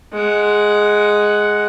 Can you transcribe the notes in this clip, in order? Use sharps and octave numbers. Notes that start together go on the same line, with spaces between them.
G#3 F#5